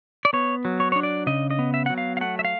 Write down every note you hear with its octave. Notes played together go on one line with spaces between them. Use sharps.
D5
B3 C#5
F#3
C#5
D4 C#5
D5
C#3 D#5
D#5
B3
E5
F#3 F#5
F5
F5
A3 F#5
E5
F5